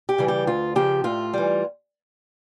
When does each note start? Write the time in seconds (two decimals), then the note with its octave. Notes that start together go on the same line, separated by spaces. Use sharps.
0.09 G4
0.18 C#3 E3 G3
0.28 G4
0.47 D2 F4
0.76 C#3 F3 G4
1.04 A2 F4
1.34 E3 G3